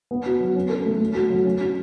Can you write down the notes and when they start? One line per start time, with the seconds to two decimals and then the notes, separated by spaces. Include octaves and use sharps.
0.11 B3
0.26 F#4
0.40 F#3
0.55 C#4
0.70 A4
0.85 A3
1.00 A3
1.15 F#4
1.30 F#3
1.45 C#4
1.60 F#4